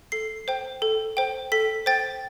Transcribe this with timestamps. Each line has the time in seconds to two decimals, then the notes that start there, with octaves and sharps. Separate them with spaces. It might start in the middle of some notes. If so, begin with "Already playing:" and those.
0.12 A4 C7
0.48 C5 G5
0.82 A4
1.17 C5 G5
1.52 A4 B6
1.86 C5 G5 A6